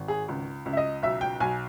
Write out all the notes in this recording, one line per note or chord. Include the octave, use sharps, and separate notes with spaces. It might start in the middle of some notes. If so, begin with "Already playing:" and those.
Already playing: G#1
G#4
C#2
C#2
E5
D#5
B1 E5
G5
B1 G#5